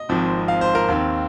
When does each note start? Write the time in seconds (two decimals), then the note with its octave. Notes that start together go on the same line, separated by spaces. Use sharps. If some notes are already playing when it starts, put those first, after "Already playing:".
Already playing: D#5
0.09 G#1 G#2 F3 C4
0.48 F5
0.61 C5
0.75 A#4
0.88 D#2 D#3 C4